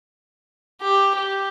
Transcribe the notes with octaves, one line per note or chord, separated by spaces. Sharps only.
G4
G4